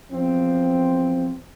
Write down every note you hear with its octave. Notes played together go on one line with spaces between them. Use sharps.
E2 F3 C4